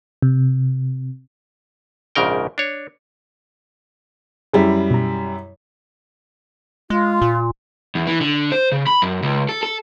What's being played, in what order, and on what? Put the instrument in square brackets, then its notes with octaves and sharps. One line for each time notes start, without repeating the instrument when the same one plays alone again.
[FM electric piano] C3
[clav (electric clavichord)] A#1 G#2 C#3 A#4 G5
D4 C#5
[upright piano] F#2 G3 E4 [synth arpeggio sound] G#4
[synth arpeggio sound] B2 A#5
[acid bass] G#3 [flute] F4
[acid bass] A#2
[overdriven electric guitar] E2
E3
D3
C5
C#3
B5
F#2
C#2
A4
A4